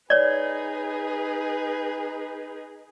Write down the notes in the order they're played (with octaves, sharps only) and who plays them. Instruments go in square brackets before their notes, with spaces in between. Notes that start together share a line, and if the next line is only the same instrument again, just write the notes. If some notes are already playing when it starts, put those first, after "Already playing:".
[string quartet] D#4 G#4 B4 [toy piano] C#5 D5